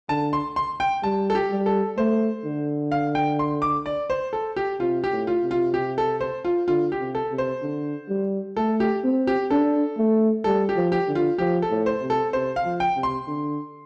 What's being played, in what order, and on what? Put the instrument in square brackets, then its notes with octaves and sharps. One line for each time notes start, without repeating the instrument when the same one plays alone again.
[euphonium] D3 [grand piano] A5
[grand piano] C6
C6
G5
[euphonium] G3 [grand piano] A5
[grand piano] A4
G4
[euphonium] G3
[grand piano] A4
[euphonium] A3 [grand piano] C5
[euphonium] D3
[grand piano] F5
G5
C6
D6
D5
C5
A4
G4
[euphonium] C3 [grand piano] F4
[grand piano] G4
[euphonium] A2
[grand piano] F4
[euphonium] C3
[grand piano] F4
G4
A4
C5
F4
[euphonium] D3 [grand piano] F4
[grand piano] G4
[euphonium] C3
[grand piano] A4
[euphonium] C3
[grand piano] C5
[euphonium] D3
G3
[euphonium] A3 [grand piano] A4
[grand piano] G4
[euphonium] C4
[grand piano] G4
[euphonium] D4 [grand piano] A4
[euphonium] A3
[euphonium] G3 [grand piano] A4
[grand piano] G4
[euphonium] F3
[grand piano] G4
[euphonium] D3
[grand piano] F4
[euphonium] F3 [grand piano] G4
[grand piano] A4
[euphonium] A2
[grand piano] C5
[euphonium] C3
[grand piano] A4
[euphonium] C3 [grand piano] C5
[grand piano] F5
[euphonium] F3
[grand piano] G5
[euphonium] C3
[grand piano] C6
[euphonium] D3